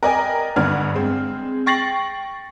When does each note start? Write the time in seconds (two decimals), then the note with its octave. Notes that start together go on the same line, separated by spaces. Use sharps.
0.03 A#4 B4 D5 D#5 G5 G#5
0.56 G1 G2 B3 D5 F6 G#6
0.94 G#3 C4
1.66 G5 C#6 A6 A#6 C7 F#7